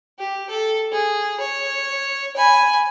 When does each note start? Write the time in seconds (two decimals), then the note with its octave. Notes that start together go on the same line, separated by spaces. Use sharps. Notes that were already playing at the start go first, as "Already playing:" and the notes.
0.19 G4
0.50 A4
0.92 G#4
1.40 C#5
2.36 G#5 B5